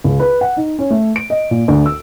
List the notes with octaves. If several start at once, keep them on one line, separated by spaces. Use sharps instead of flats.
C#2
B4
F#5
D#4
C#4
A3
D7
D#5
A#2
D2
E6